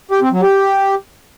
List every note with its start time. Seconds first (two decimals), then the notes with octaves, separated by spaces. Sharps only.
0.11 G4
0.22 C4
0.32 F#3
0.42 G4